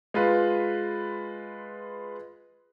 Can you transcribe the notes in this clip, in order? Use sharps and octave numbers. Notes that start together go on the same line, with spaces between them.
G#3 F4 B4